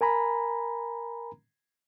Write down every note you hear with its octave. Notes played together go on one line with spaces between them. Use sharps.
A#4 G#5 A#5 B5